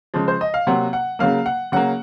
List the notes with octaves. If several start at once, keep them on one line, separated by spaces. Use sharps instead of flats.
C#3 F3 G#3
C5
D#5
F5
C3 F#3 A#3 F#5
F#5
C#3 F#3 A#3 F5
F#5
C#3 F#3 A#3 F#5